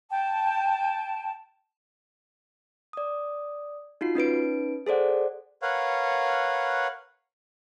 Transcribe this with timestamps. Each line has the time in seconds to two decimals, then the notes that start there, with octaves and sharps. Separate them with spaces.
0.12 G5 A5
2.93 D5 D#6
4.01 D#4 F4 F#4 C7
4.15 C#4 D#4 B4 D7
4.86 G#4 A4 C5 D5 F#5
5.62 A#4 B4 C#5 F5 F#5